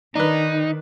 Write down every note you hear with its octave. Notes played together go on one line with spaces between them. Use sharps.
D#3 D4 D#4 B4